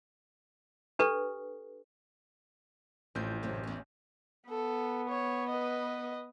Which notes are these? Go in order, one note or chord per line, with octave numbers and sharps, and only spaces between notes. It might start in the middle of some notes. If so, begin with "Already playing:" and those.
D4 G4 A4 B4
A1 F2 A2 C4 G6
F#2 A2 C3
E2 C#4
B3 A4
C#5
B4 D#5